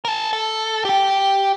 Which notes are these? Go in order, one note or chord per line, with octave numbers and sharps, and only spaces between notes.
A#4 A5
A4
G4 G5